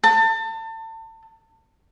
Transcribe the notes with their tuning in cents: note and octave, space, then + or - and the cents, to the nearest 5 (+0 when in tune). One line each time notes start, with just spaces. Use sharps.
A5 +30